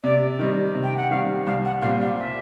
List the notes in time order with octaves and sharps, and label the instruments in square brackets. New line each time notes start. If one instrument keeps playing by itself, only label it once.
[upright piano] C3 [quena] D5
[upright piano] D#3 G3 C4 [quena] D#5
[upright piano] C3
[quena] G5
F#5
[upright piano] D#3 G3 C4 [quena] F5
[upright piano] C2 [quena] F5
[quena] F#5
[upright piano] A#2 G3 C4 [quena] F5
[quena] F5
E5